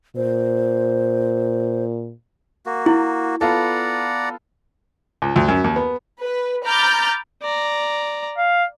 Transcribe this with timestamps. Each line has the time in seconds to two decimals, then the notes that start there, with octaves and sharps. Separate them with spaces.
0.16 A#2 C5
2.66 A#3 F#4
2.86 E4
3.41 B3 F4 A4 D5 F#5 A#5
5.22 C#2
5.36 D2
5.48 F#2
5.64 D#2
5.76 B3
6.21 B4
6.65 A#5 B5 D6 F6 G6 A6
7.42 D5 A#5
8.37 F5